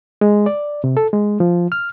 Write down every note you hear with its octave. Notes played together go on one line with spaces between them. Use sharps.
G#3
D5
C3
A4
G#3
F3
F6